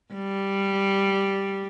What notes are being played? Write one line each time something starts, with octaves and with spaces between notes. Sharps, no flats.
G3